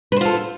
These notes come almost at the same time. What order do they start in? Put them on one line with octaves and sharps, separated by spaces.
B4 C5 F4 A4